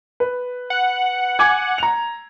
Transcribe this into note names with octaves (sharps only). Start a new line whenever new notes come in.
B4
F#5
G#5 D6 G#6
A#5 F7